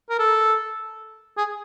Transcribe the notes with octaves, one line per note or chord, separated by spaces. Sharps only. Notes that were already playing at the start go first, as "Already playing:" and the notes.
A#4
A4
G#4